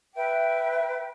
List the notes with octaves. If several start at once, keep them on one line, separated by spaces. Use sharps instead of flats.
B4 E5 G5